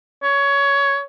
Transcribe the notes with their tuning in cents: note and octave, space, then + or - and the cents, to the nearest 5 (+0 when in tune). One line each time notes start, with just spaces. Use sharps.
C#5 +15